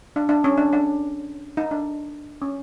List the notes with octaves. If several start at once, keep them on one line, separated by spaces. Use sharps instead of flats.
D4
D4
C#4
D4
D4
D#4
D4
C#4